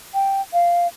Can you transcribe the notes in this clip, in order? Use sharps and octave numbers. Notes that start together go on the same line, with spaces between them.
G5
F5